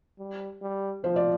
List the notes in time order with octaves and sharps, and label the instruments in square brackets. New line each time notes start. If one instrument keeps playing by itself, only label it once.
[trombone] G3
G3
[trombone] F3 [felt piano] C5
[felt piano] D5